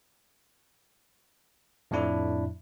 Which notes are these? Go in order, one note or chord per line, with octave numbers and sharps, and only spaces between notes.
F2 A2 A3 D4 E4